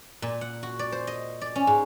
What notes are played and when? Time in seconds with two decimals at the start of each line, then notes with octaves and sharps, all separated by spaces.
0.22 A#2
0.41 F#5
0.63 F#4
0.79 D5
0.92 C5
1.07 D#5
1.41 D5
1.55 C#4
1.67 G#2